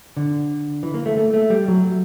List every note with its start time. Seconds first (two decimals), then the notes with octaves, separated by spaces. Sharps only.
0.17 D3
0.83 E3
0.94 A#3
1.06 A3
1.17 A3
1.34 A3
1.50 G3
1.68 F#3